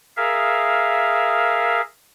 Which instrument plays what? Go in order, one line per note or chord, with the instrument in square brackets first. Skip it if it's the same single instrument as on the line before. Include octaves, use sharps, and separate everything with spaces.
[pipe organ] G#4 A#4 E5 F5